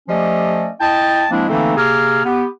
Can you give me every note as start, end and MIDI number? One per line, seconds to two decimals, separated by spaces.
0.09 0.69 53
0.09 0.69 57
0.09 0.69 61
0.09 0.69 67
0.09 0.69 74
0.09 0.69 75
0.80 1.25 64
0.80 1.25 75
0.80 1.25 79
0.80 1.25 81
1.31 1.46 53
1.31 1.46 56
1.31 1.46 58
1.31 1.46 60
1.31 1.46 62
1.31 1.46 64
1.49 1.77 50
1.49 1.77 52
1.49 1.77 57
1.49 1.77 58
1.49 1.77 60
1.49 1.77 63
1.77 2.24 48
1.77 2.24 58
1.77 2.24 68
1.77 2.24 89
2.25 2.45 59
2.25 2.45 67